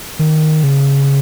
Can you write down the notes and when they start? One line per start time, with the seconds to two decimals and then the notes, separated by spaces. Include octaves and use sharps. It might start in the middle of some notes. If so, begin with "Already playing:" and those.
0.19 D#3
0.64 C#3